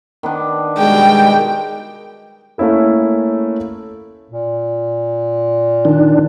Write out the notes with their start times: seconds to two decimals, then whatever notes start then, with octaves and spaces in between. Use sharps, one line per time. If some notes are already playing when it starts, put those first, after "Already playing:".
0.23 D#3 B3 D4
0.78 B2 G3 G#3 G5
2.58 A3 A#3 C#4 E4 A#4
4.31 A#2
5.85 D#3 D4